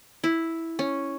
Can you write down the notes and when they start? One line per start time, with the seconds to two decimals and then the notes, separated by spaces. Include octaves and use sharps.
0.24 E4
0.79 C#4